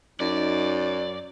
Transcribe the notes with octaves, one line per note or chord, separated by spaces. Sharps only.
F#2 D#4 D5